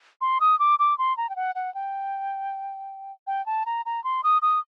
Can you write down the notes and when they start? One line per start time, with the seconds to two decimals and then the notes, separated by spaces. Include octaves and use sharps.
0.21 C6
0.41 D#6
0.59 D6
0.79 D6
0.98 C6
1.17 A#5
1.30 G5
1.36 F#5
1.55 F#5
1.75 G5
3.27 G5
3.46 A5
3.66 A#5
3.86 A#5
4.04 C6
4.24 D#6
4.42 D#6